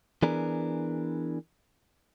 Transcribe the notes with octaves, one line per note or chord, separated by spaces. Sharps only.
E3 B3 D4 G#4 A#4